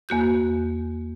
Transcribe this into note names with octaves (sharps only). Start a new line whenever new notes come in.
E2 A#3 F#4 G6